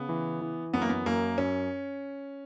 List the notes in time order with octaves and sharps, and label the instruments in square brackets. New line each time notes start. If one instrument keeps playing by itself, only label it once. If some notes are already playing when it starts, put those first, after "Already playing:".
Already playing: [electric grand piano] C#3 [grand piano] B3
[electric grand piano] E3
E3
[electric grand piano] F#2 [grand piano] B3
[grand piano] A#3
B3
[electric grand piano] F#2 [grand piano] A#3
[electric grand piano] F#2 [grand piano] C#4